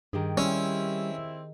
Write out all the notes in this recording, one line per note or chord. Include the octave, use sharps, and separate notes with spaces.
G2 D#3 G4 G#4
G3 C4 C#4 E4